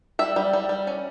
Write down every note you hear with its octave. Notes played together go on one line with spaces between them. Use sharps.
G3 E5
G3
G3
G3
C#4